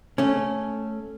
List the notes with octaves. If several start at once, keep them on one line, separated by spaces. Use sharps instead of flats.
A3 C#4